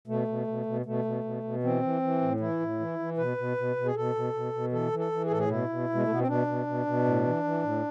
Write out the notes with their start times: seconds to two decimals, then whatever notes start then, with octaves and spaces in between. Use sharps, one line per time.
0.07 B2 A3
0.28 B2
0.47 B2
0.66 B2
0.86 B2 A3
1.05 B2
1.24 B2
1.43 B2
1.63 E3 C4
1.82 E3
2.02 E3
2.21 A2
2.40 E3 E4
2.60 A2
2.80 E3
2.99 E3
3.17 B2 B4
3.37 B2
3.57 B2
3.76 B2
3.85 G#4
3.95 B2 A4
4.15 B2
4.33 B2
4.53 B2
4.72 E3 A4
4.92 E3
4.99 A4
5.12 E3
5.25 G#4
5.30 A2 A4
5.39 G#4
5.49 B2 E4
5.69 B2
5.89 B2
5.95 G#3
6.03 A3
6.08 B2 B3
6.19 C4
6.27 B2 D4
6.47 B2
6.66 B2
6.86 B2
7.05 A2
7.24 E3
7.44 E3
7.63 A2